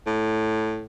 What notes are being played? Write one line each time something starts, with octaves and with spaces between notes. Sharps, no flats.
A2